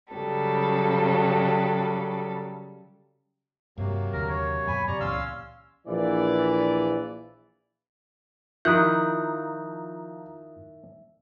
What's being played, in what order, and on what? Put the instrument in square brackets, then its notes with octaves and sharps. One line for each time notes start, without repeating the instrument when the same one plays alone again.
[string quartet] C#3 F#3 G3 A4
[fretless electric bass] G2 [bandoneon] C3 F#3 A#3
[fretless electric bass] D#2 D3 [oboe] A#4
[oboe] C#5
[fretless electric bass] F#2 B2 [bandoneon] G#5 [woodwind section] B5
[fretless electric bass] F#2 C#3 [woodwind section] B3 G4 D5 [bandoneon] A#5 C#6
[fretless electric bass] C#2 A#2 E3 [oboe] C#4 [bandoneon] F5 C6 E6
[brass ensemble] A#1 E3 D5
[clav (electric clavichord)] D#3 E4 [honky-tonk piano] F3 A#5 [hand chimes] E5 [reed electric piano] D#6 F#6 G6